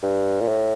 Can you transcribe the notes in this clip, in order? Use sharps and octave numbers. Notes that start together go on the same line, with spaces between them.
G2
A#2
A2